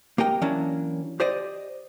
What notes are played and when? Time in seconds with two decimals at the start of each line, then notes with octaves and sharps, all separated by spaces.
0.18 A#3 G4 A#4 D#5 G5
0.42 E3 F#3 A#3 C#4 D4
1.20 G4 C5 D5 D#5